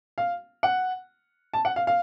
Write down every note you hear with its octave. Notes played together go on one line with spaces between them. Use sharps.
F5
F#5
A5
F#5
F5
F5